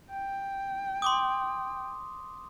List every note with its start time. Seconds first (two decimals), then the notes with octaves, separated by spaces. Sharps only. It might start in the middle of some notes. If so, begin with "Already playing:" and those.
0.10 G5
1.02 C6 D6 D#6